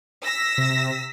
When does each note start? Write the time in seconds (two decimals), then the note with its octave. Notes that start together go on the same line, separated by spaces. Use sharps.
0.23 E6 A#6 B6
0.58 C3